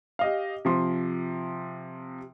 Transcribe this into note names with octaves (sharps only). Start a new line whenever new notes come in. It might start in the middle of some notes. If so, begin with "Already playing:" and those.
G4 D#5 F5
C3 F3 C6